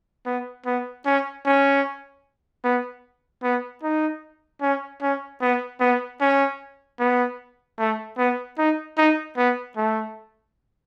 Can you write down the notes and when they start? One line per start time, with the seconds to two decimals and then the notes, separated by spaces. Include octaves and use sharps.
0.26 B3
0.66 B3
1.06 C#4
1.46 C#4
2.64 B3
3.43 B3
3.83 D#4
4.62 C#4
5.02 C#4
5.41 B3
5.80 B3
6.21 C#4
7.00 B3
7.79 A3
8.18 B3
8.58 D#4
8.98 D#4
9.37 B3
9.77 A3